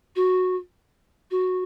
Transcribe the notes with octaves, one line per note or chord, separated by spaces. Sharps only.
F#4
F#4